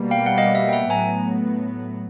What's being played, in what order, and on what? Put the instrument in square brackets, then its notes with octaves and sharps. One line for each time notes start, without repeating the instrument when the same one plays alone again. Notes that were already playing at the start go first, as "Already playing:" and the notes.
Already playing: [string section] B2 G3 A#3
[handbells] F5 G5
F#5
D#5 F5
E5 F#5
G5
E5 F#5
[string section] A2 F#3 B3 [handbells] G#5 A#5